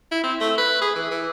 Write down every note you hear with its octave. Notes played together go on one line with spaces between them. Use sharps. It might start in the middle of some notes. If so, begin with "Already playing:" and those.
E4
C4
A3
B4
G#4
E3
E3